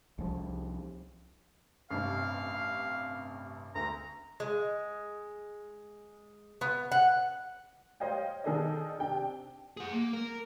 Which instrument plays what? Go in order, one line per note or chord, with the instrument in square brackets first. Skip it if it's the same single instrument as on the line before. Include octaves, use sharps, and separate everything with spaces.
[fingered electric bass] C2 F3
[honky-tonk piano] A1 G2 C3 [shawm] F5
[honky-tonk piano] D2 [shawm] A#5
[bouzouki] G#3
B3
F#5
[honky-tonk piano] C5 C#5 D#5 F5 G5
D#3 D#4 G#4 A4 D5 D#5
C3 D4 G5
[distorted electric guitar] G#4 F#5
A#3
A#4